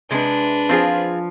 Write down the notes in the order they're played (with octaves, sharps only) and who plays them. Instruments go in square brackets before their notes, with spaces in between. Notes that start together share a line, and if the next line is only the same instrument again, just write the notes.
[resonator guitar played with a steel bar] C3 G#3 [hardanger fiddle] D4 B4
[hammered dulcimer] F3 [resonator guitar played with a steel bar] C4 F4 G#4